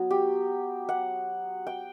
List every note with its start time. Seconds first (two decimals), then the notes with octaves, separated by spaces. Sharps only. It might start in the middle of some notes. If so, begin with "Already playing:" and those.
Already playing: F#3 B3
0.11 G4
0.89 F#5
1.67 G5